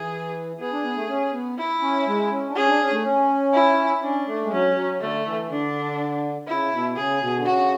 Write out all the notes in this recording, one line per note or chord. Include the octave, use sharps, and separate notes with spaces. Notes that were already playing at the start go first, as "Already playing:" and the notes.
Already playing: E3 G#4
B3 G#4
D4
B3
A3
C#4
B3
E4
C#4
G#3
C#4
D4
C#4 G#4
D4
C#4
A3
C#4
E4
C#4 D4
A3
G#3
F#3 C#4
F#3
D3 A3
E3
D3 D4
C#3 E4
B2
C#3 G#4
B2
D3
C#3 F#4